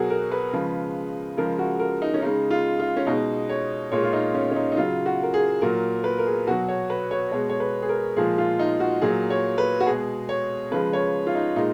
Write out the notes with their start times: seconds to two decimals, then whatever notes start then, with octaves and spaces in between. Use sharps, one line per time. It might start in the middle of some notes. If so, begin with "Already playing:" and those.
Already playing: B2 F#3 F#4 G#4 A#4
0.10 A#4
0.32 B4
0.53 C#3 F3 G#3
1.37 C#3 F3 G#3 A#4
1.59 F#4
1.79 A#4
2.02 D#4
2.14 C#4
2.22 C#3 G#3 D#4
2.51 F4
2.80 F4
2.97 C#4
3.07 B2 G#3 D#4
3.49 C#5
3.92 A#2 G#3 C#5
4.03 F4
4.13 D#4
4.34 C#4
4.51 C#4
4.56 D#4
4.72 D#4
4.77 C#3 F#3 F4
5.06 F#4
5.23 A#4
5.34 G#4
5.61 A#2 F#3 A#4
6.04 B4
6.19 A#4
6.26 G#4
6.47 B2 F#3 F#4
6.68 C#5
6.90 B4
7.11 C#5
7.31 B2 G#3 C#5
7.49 C#5
7.60 B4
7.82 G#4
7.89 A#4
8.17 A#2 F3 G#3 G#4
8.38 F4
8.59 D#4
8.80 F#4
9.02 A#2 F#3 G#4
9.30 C#5
9.58 B4
9.80 F#4
9.86 B2 G#3 G#4
10.29 C#5
10.71 C#3 F3 G#3 B4
10.93 C#5
11.27 F4
11.35 D#4
11.56 A#2 G#3 D#4